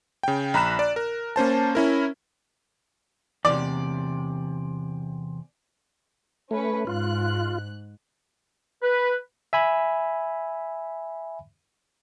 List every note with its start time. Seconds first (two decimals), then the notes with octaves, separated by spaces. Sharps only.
0.23 C#3 G5
0.54 A#1 A#5 B5 F#6 E7
0.79 D5
0.96 A#4
1.36 A#3 C#4 C5 A5
1.75 C#4 E4 A#4
3.45 E2 C3 D5
6.51 A3 C#4 B4
6.87 G#2 F4 F#6
8.83 B4
9.53 E5 G#5 B5